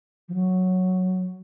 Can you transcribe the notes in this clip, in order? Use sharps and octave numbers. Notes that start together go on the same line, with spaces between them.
F3
F#3